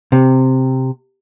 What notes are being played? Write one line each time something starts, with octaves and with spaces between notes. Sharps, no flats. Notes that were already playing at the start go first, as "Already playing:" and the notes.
C3